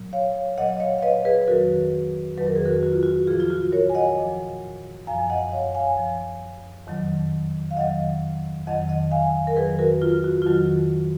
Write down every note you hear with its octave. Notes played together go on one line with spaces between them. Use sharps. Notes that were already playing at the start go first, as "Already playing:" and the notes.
Already playing: A#2 F#3
C#5 F5
A#2 F#3 D#5 F#5
D#5
C#5 F5
F5
B4 D#5
G#4 B4
B4
F2 D#3 F#3 F#4 A#4
F2 D#3 F#3 B4
A#4
G#4
F#4 A#4
F#4
F4
F#4
A#2 F3 F4 G#4
F4
F#4
A#4 C#5
G#5
D#5 F#5
A#2 F3
F#2 F3 F5 G#5
D#5 F#5
F#5
C#5 F5
F5 G#5
F#2 F3
F2 D#3 F#3
F5
F2 D#3 F#3 D#5 F#5
F2 D#3 F#3 D#5 F#5
D#5 F#5
F5 G#5
A#4
F2 D#3 F#3 G#4 B4
F#4 A#4
F4
F#4
F4
F2 D#3 F#3 F#4